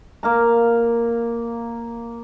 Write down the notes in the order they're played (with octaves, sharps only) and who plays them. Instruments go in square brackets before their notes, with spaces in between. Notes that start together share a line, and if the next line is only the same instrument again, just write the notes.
[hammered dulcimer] A#3 F5 A#5